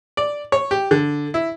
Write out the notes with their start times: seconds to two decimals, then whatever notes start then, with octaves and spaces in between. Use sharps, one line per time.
0.17 D5
0.52 C#5
0.71 G4
0.91 D3
1.34 E4